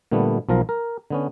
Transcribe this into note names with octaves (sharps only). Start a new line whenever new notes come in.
A#2 D3 G3 A3 B3
B1 F3 A#4 A#5
A#4
D3 B3 C#4